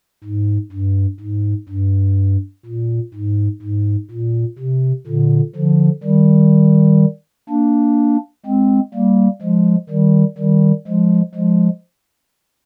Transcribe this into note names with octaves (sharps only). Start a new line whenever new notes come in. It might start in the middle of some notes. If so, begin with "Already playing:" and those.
G#2
G2
G#2
G2
A#2
G#2
G#2
A#2
C3
A#2 D3
D3 F3
D#3 G3
A#3 D4
G#3 C4
G3 A#3
F3 G#3
D#3 G3
D#3 G3
F3 G#3
F3 G#3